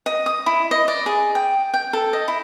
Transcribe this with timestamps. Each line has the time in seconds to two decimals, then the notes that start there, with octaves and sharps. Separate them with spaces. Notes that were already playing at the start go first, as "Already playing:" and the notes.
0.06 D#5
0.26 D#6
0.46 E4
0.71 D#5
0.88 D5
1.06 G#4
1.35 G5
1.74 G5
1.93 A4
2.13 D#5
2.28 E4